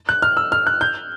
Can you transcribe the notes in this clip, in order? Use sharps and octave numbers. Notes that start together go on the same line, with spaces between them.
F#6
F6
E6
F6
F#6
G6